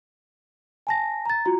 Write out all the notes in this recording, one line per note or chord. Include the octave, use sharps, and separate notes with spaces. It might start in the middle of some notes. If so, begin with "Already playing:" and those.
G#5 A5 A#6
A#5 A6
F4 F#4 A#5